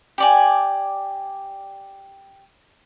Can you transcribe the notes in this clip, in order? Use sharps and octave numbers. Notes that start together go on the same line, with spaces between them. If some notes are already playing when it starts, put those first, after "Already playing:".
G4 D5 G#5